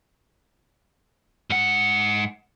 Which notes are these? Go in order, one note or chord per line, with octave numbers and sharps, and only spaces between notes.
G#2 F#5